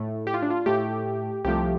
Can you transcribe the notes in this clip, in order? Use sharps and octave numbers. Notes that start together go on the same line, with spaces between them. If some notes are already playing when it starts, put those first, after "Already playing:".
Already playing: A2 A3
G4
F4
D4
F4
A2 A3 G4
C2 C3 F3 A3 G4